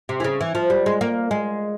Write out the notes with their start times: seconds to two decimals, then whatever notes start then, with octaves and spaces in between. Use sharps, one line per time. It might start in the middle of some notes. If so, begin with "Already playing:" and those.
0.09 C3
0.20 E3
0.24 C#3
0.41 E3
0.55 F3
0.70 G3
0.86 G#3
1.01 A#3
1.31 G#3